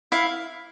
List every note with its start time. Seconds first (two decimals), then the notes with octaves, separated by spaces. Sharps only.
0.12 E4 F5